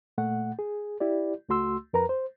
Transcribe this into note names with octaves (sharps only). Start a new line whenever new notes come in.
A#2 A3 F#5
G#4
E4 G4 D5
C#2 A3 F#4 C6 E6
F2 A#4 B4 A#5
C5